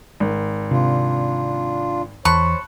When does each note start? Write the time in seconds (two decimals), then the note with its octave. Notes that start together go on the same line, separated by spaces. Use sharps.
0.20 G#1
0.71 C3 D4 F4
2.25 E2 C5 C#5 A5 B5 C#6 F#6